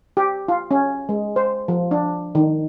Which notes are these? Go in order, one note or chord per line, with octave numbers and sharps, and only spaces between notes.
G4
F4
C#4
G#3
C5
F3
D4
D#3